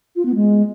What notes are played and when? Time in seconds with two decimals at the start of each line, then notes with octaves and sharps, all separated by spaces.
0.16 F4
0.25 B3
0.35 G#3